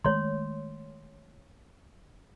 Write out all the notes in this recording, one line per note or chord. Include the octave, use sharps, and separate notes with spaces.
D#3 G#3 A3 C#5 C6